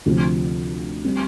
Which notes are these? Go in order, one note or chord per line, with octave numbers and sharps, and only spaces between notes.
D2 C3 F3 C4
G3 C4